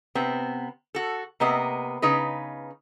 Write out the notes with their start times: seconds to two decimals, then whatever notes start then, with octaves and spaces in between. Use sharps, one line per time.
0.15 C3 B3 C4
0.95 F#4 A4
1.40 C3 A#3 B3 D#5
2.02 C#3 D#4 B4